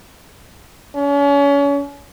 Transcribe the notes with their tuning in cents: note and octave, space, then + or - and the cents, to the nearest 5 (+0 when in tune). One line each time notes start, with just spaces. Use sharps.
C#4 +35